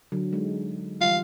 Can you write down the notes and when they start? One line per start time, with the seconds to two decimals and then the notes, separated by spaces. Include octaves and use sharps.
0.12 D3 F#3
0.33 G#3 D#4
1.01 E3 G3 F4 F5